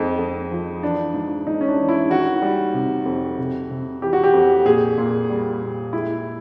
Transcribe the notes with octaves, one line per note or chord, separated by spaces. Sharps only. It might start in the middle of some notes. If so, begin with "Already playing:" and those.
Already playing: F2 G#3 D#4
F2
F3
E3 D4
G#2
G#2 D#4
C#4
D4
E3
E4
D#3 F#4
G3
C3
F2
C3
C3
E3 G4
F#4
G4
F2
A#2 G#4
A#2
G3
A#2
G#3 E4